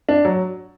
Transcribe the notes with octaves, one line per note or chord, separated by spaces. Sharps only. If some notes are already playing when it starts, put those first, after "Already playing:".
D4
F#3